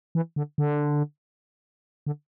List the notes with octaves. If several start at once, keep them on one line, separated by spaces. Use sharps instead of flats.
E3
D3
D3
D3